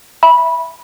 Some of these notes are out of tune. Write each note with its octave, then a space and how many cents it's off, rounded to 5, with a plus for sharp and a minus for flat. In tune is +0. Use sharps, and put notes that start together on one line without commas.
E5 +0 B5 -15